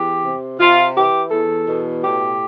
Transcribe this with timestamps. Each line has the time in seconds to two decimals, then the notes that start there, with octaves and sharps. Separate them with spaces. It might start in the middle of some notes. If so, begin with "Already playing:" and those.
Already playing: E2 G4
0.24 C3
0.59 C3 F4
0.96 E3 G4
1.31 E2 A4
1.68 B2
2.03 A2 G4